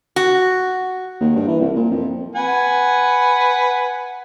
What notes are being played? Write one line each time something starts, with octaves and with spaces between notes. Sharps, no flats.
F#4
D#2
G2
E3
C2
A#2
F2
B4 F#5 G#5